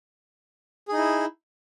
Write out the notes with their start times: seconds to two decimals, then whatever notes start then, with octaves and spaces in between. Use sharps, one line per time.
0.88 G#4
0.93 D#4
0.97 E4